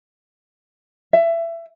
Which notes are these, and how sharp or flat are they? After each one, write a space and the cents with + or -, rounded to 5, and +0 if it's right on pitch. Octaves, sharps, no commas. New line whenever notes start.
E5 +25